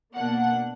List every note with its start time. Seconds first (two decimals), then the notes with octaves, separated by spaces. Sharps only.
0.16 B2 A#3 D4 F#5